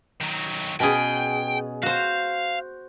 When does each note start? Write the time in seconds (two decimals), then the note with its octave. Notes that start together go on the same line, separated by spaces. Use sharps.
0.21 D#3 F#3
0.80 B2 C#4 G#4 G5
1.83 F#4 C5 F5